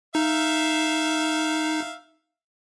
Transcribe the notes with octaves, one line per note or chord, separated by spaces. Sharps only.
D#4 E5 F5